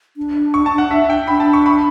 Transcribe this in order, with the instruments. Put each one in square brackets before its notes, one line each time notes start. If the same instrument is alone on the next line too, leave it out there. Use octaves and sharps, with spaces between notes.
[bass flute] D4
[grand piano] C#6
A5
F#5
E5
G5
[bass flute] D4 [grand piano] B5
[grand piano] A5
C#6
B5